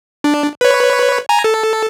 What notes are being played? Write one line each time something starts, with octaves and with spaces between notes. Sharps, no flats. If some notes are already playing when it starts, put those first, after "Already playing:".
D4
B4 C#5
G#5 A#5
A4